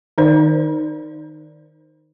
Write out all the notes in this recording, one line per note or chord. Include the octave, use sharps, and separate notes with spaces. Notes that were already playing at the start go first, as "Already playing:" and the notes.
D#3 D#4 C5 D5